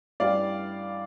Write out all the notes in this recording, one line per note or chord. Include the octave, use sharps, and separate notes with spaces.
A1 G2 E3 G3 D5 F5